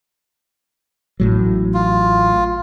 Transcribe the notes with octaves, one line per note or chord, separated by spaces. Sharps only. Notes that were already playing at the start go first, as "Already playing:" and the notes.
A1 A2 F#3
F4